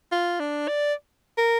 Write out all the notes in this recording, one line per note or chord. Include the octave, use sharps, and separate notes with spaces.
F4
D4
D5
A#4